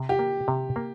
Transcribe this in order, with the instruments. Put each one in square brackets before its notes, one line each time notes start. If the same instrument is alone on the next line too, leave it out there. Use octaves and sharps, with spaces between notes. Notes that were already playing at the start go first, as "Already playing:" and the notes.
Already playing: [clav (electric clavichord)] C3
[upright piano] G4
[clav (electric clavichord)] A#3
C3
A#3